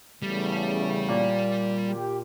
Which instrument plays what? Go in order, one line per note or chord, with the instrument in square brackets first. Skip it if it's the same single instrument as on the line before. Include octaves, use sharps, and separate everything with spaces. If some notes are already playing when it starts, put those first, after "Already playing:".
[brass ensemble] E2 C#3 A3 [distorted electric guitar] G3
[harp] A#2
[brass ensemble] G4